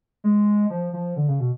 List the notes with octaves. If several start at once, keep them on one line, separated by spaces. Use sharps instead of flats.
G#3
F3
F3
D3
C#3
B2